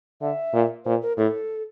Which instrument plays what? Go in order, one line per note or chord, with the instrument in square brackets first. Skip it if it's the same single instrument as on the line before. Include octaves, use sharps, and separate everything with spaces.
[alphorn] D3 [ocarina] E5
[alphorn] A#2
[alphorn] A#2 [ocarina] C5
[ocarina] A#4
[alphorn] A2 [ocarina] A4